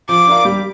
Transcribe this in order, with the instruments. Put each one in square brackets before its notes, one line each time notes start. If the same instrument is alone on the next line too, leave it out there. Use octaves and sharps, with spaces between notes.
[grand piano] F3 [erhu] D6
[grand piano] D4 A#4 F5
G3